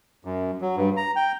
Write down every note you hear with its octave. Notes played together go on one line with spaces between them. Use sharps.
F#2
F#3
G2
A#5
G5